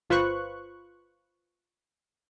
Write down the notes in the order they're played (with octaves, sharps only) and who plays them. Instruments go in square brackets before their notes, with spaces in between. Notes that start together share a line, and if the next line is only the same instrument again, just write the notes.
[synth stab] G1 F4 B4 C5 C#6 F#6